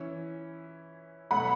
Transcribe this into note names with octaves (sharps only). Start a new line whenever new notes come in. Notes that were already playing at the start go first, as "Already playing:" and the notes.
Already playing: E3 C#4 E4
B2 F#3 A3 F#5 B5